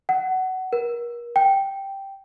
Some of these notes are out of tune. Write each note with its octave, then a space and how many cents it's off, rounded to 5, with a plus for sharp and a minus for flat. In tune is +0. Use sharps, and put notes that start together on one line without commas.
F#5 +20
A#4 +35
G5 -5